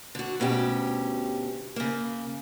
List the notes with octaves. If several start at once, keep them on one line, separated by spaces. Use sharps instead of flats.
D3 F#4
D2 B2 C#4 G4
C#3 A#3